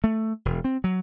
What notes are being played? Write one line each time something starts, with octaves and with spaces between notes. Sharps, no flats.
A3
E1
C4
F#3